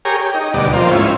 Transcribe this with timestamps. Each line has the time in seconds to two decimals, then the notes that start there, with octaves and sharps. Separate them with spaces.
0.05 G4 G#4 A#4 C#5
0.20 G4
0.34 D#4
0.54 D2 B2 G3 D#4 D5
0.73 F3 A#3 C4 F4
0.91 G#2 C#4 E4 F4